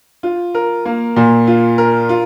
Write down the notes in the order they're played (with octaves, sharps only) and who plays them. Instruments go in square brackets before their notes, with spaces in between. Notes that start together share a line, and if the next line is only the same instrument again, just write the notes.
[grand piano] F4
A#4
A#3
A#2
F4
A#4
F4